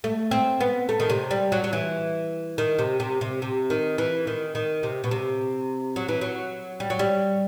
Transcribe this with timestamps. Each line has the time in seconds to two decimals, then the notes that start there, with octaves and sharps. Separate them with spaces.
0.04 A3
0.31 C4
0.61 B3
0.89 A3
1.00 D#3
1.10 C3
1.31 G3
1.52 F#3
1.64 F#3
1.73 E3
2.58 D#3
2.79 C3
3.00 C3
3.21 C3
3.42 C3
3.70 D#3
3.98 E3
4.27 D#3
4.55 D#3
4.83 C3
5.04 B2
5.11 C3
5.96 F#3
6.08 E3
6.21 F#3
6.80 G3
6.90 F#3
6.99 G3